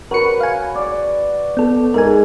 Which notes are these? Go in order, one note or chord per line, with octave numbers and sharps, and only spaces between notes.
F#4 A#4 B4 C#5 C#7
F5 G#5
D5
B3 A4
G#2 A#4 G#5